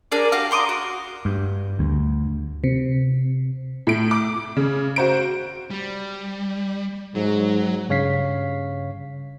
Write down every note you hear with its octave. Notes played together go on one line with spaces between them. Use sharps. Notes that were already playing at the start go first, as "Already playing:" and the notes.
D4 G#4 A#4 D5
F#4 G4 F5
A#5 C6 D6 D#6
F#4
G2
D2
C3
A2 D7
D6
C#3
F#4 C5 D7
G3
G#2 F#3
G2 C#3 C#5 F5 B6 C7